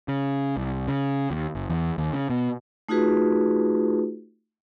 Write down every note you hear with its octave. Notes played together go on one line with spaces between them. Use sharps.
C#3
C2
C#3
D#2
F#1
E2
D#2
C#3
B2
A3 D#4 F4 F#4 G#4 B4